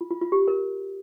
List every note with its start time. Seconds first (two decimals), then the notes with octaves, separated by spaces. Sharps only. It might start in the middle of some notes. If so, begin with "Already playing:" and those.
0.01 F4
0.11 F4
0.21 F4
0.32 G4
0.48 A#4